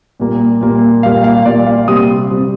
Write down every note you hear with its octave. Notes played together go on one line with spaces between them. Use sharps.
A#2 G3 A#3
A#2 G3 A#3
A#2 G3 A#3 F5
F5
A#2 G3 A#3 D5
F5
C3 G3 C4 D#6
C3 G3 C4